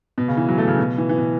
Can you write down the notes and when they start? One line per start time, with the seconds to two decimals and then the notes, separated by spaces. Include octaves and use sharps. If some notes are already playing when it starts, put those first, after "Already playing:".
0.18 B2
0.28 C#3
0.37 E3
0.49 F#3
0.58 A3
0.68 C#3
0.79 B2
0.98 E3
1.09 E3
1.18 B2